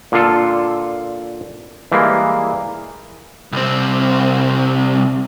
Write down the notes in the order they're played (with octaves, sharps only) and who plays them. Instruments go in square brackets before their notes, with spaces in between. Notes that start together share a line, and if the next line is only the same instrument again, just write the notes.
[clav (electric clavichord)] A#2 D3 F4 A4
E3 G3 G#3 A#3
[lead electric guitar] C2 C4